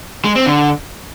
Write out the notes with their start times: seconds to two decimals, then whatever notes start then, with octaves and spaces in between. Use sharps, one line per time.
0.25 G#3
0.35 C4
0.46 D3